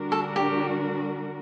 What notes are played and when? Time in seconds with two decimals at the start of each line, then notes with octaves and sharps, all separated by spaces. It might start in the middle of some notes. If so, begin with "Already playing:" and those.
Already playing: D3 G3 D4 F#4 A#4
0.12 A4
0.36 G4